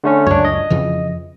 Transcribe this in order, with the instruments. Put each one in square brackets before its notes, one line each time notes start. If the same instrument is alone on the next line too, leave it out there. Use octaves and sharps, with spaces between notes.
[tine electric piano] D3 A3 C#4
[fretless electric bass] C#2 F#2 [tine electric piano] D4 C#5
[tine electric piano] D#5
[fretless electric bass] F2 C#3 E3